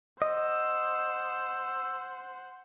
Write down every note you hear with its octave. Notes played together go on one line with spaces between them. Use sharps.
C5 D#5 F#5 E6